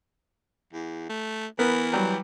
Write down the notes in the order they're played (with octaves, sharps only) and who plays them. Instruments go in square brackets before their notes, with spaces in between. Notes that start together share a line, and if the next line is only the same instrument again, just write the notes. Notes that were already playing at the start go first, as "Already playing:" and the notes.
[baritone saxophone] E2
A3
[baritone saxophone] E3 [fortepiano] B3 A#4
[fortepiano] F#3 G3